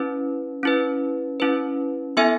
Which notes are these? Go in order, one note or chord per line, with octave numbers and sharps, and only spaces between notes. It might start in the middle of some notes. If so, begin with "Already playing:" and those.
Already playing: C#4 E4 B4
C#4 E4 B4
C#4 E4 B4
B3 E4 A4 E5 G#5